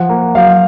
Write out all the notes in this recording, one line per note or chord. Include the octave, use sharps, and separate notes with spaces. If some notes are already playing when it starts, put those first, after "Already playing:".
Already playing: F3 F#5
A#3
F#3 F5